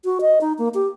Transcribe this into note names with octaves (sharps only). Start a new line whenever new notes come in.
F#4
D#5
D#4
A#3
G4